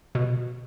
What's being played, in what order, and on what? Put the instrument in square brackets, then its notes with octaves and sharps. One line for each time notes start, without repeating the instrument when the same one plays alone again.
[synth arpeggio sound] B2